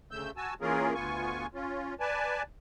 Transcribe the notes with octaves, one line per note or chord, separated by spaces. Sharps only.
D2 C#3 A3 E6 G6
F#4 G#5 A5 E6
E3 A#3 C#4 F4 G#4 A#4
D2 B3 F4 G#5 C#6
C#4 F4
B4 D5 G#5 A5